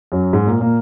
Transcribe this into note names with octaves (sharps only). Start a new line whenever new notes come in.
F#2 F#3
G#2 G#3
A#2 A#3
A#2 A#3